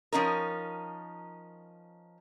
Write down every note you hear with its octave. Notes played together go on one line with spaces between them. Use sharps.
F3 C#4 D#4 A#4